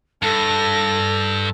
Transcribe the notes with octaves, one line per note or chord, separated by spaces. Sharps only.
G2 A4 A5 A#6